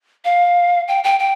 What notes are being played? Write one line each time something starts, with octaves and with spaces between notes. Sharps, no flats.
F5
G5
G5
G5